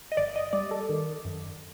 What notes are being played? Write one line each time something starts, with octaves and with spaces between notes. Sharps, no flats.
D#5
G1 D5
D#5
G3 D5
A4
D#3
F#2